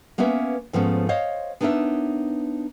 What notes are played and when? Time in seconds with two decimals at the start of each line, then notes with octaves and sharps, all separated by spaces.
0.18 A#3 B3 C#4 B4 E5
0.73 G#2 F3 A3 B3 C#4
1.09 C5 C#5 D#5 F5
1.61 B3 D4 D#4 A#4 C#5 E5